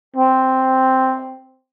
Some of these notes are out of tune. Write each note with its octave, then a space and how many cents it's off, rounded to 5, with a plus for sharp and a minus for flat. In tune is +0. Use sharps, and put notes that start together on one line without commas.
C4 +0